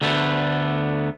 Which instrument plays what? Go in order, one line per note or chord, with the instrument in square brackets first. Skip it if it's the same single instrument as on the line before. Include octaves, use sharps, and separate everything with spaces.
[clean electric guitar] D2 D3 A3 B3